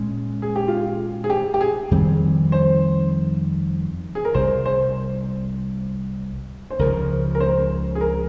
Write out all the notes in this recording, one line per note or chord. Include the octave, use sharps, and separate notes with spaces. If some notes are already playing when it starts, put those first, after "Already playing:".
Already playing: A#2 G#3 C#4
G#4
G4
F4
G#4
G4
G4
G#4
F2 D#3 G3 C4
C5
G#4
A#4
C2 C3 G3 C5
C5
C5
C#2 C#3 F3 A#4
A#4
C5
G#4
A#4